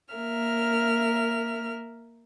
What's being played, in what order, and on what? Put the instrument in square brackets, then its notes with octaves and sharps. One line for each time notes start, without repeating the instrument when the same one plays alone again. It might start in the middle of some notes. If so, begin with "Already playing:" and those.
[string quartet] A#3 A#4 E5 F6